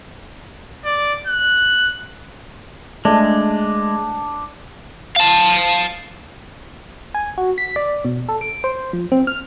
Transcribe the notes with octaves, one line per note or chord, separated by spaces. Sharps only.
D5
F#6
G#3 A3 D4
F5 A5
G#5
F#4
B6
D5
B2
A4
D7
C5
F3
C4
F6